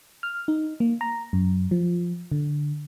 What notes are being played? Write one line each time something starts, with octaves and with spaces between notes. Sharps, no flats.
F6
D#4
A#3
A#5
F#2
F3
D3